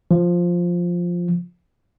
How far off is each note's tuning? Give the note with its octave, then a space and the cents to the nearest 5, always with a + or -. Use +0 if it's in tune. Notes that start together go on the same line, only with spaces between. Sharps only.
F3 +5